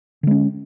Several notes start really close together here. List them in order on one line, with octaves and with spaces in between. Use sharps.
D3 G#3 C#4